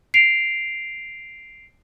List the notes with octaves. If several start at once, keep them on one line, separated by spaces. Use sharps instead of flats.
C7 D7 F7